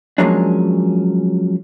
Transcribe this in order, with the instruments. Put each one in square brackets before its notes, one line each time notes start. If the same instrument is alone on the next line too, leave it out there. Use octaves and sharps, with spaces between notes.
[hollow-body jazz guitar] F3 F#3 G#3 A#3 C#4 D4